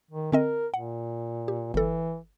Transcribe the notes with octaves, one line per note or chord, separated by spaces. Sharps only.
D#3
D3 C4 A#4 D#5
A#2 F#5
G4
G1 E3 A4